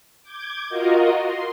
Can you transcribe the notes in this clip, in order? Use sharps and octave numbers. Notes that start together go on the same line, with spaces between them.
D6 G6 G#6
F4 F#4 A#4 D#5
C6